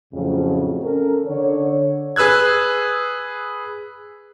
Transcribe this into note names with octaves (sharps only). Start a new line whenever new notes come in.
F2 A2 C#3 F3 F#3
C#4 A4 A#4
D3 C#5
G#4 B4 E6 F#6 G#6